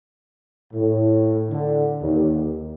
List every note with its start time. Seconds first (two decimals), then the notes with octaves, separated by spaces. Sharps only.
0.74 A2
1.51 D3
2.03 D#2